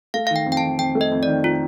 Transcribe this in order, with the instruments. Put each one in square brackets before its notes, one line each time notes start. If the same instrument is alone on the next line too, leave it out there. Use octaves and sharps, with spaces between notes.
[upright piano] A3 [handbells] F5
[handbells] F5
[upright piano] D#3 [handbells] G5
[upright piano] F2
[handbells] G5
A5
[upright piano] D#3
[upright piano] F2 [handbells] G5
[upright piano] A3
[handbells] D#5
[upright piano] F2
[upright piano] D#3 [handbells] D5
[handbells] F4